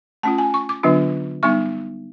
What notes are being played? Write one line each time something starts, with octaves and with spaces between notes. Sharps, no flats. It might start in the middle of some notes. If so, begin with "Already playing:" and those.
A3 C#4 F4 A5
G#5
C#6
D6
D3 F#3 B3 D4 F4
G3 B3 D#4 C#6